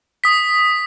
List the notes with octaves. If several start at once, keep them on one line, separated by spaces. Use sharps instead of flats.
D#6 B6